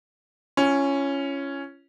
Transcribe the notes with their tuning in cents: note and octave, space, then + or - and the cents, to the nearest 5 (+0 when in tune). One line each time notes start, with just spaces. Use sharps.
C#4 +0 F4 -40